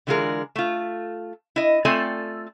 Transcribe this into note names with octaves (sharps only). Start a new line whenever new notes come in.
D3 E3 G#3 F4 G#4 A#4
A3 F4
E4 D#5
A3 C4 F4 A4 D5 G#5